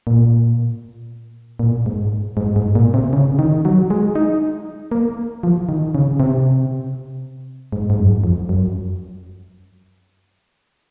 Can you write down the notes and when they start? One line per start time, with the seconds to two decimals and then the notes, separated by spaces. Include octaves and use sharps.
0.07 A#2
1.59 A#2
1.86 G#2
2.37 G#2
2.56 G#2
2.75 A#2
2.94 C3
3.13 C#3
3.39 D#3
3.65 F#3
3.90 G#3
4.15 D#4
4.92 A#3
5.43 F3
5.69 D#3
5.95 C#3
6.20 C3
7.72 G#2
7.90 G#2
7.99 F#2
8.24 F2
8.49 F#2